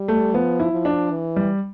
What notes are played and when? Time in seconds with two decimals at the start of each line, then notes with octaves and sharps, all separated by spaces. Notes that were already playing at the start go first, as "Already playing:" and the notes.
Already playing: G3
0.08 A3
0.34 F3 B3
0.60 E4
0.72 F3
0.85 D4
1.10 E3
1.36 G3